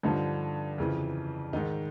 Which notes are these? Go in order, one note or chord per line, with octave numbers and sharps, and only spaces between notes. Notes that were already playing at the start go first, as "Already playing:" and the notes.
G2 D3 F3 D#4
F2 C#3 E3
G#2 D#3 D#4